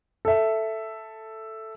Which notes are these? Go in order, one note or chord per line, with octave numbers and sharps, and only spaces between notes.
A4 E5